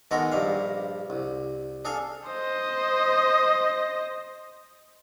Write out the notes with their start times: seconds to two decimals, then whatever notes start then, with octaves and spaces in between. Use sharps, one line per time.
0.11 D#3 G#3 B3 F#4 A4 A#4
0.32 A#1 G2 G3 F5
1.10 C2
1.85 D4 G#4 A4 F5 G#5 A5
2.28 C5 D#5